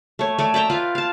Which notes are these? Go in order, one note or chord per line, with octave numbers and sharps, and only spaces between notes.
A3 C#5
A3 C#5 D5
D5 E5 G5 A#5
F4 B4 F5
F5 A5